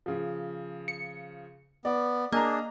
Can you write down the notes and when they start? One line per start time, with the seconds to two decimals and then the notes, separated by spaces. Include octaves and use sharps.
0.06 C#3 F3
0.88 C#7
1.85 B3 D5
2.32 A#3 D4 G#4 D#5 A#5